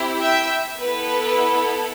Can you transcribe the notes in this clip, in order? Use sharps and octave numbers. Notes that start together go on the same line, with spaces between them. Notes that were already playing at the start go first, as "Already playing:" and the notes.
Already playing: C4 E4 G4
E5 G5
B3 E4 A4 B4